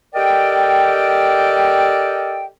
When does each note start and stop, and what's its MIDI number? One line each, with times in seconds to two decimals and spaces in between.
0.15 2.46 67
0.15 2.46 69
0.15 2.46 70
0.15 2.46 74
0.15 2.46 75
0.15 2.46 79